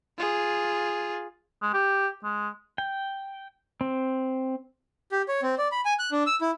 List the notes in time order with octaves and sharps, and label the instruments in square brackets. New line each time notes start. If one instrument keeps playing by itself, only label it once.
[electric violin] F4 G#4
[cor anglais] G#3
G4
G#3
[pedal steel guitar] G5
C4
[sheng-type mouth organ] G4
C#5
C4
D5
B5
G#5
F#6
D4
E6
E4